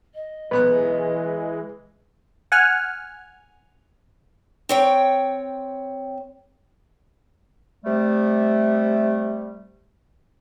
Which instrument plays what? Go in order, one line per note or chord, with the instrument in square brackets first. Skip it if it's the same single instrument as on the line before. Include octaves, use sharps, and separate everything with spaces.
[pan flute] D#5
[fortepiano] B1 B3 F#6 [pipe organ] E3 G#3 [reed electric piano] B4
[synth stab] F#5 G#5 F6
[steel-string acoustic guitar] C4 C#5 G5
[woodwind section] C3 G3 A3